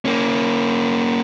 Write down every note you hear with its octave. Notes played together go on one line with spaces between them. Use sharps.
A#3 C#4